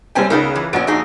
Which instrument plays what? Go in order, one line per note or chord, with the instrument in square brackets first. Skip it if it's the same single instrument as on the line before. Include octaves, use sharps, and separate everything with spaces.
[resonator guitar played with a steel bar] F#2 C#4 G#5 [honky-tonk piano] G3 C4 G5
[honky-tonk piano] C#2 C#3 [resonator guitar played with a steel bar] B3 D#4 A#4
[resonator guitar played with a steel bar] E3
[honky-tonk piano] A#1 F#4 D7 [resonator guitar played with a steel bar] B3 C#4
[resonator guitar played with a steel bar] F2 D#4 G#4